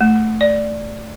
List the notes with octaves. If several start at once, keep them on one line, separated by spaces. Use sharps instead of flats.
A3
D5